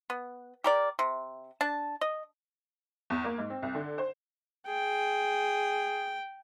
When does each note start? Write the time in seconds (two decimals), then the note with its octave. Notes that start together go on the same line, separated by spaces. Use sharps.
0.10 B3
0.64 G4 A#4 D5
0.99 C3
1.61 D4 A5
2.01 D#5
3.10 E2
3.24 A#3
3.38 G#2
3.50 C4
3.62 C2
3.75 D3
3.98 C5
4.68 G#4 G5